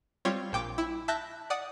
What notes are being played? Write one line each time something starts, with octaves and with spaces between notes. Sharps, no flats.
G3 C4 F4 C#5
A#1 A#2 G5 D6
E4
E5 A5 F#6 G6 A#6
D5 F#5 D#6